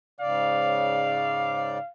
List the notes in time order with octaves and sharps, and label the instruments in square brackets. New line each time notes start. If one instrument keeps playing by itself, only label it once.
[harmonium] G#2 C#3 D5 [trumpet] F5